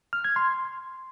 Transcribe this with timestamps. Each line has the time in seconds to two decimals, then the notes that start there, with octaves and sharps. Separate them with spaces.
0.13 F6
0.24 G#6
0.36 C6